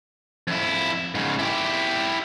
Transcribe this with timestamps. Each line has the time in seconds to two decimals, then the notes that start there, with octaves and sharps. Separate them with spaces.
0.47 F2 E4
1.15 G#2 C#3
1.39 E4 G4